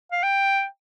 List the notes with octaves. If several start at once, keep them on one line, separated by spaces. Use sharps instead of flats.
F5
G5